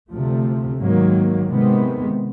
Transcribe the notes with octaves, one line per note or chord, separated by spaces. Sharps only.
D2 C3 F3 A3
G#2 D#3 F#3 A#3
C3 D#3 G#3 B3